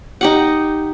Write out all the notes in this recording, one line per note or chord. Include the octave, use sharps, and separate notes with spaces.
D#4 G4 F#5